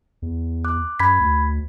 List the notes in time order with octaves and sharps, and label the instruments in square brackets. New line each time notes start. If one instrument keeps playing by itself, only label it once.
[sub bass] E2
[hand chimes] D6 F#6
[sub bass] F#2 [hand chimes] B5 G#6 B6
[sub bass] D2